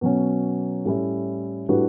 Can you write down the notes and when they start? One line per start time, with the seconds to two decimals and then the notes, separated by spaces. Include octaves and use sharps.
0.01 B2 F#3 C#4
0.85 A2 G3 C#4 E4
1.69 A2 G3 D4 F#4 B4